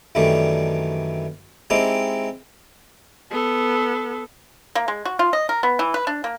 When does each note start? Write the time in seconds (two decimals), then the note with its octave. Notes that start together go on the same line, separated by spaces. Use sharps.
0.15 F#2 D#3 E3 G3 A3 D4
1.70 G#3 C4 D#4 E4 G4
3.31 B3 A4
4.75 A#3
4.88 G#3
5.05 F#4
5.19 F4
5.33 D#5
5.49 A#4
5.63 B3
5.79 E3
5.94 B4
6.07 D4
6.24 A#3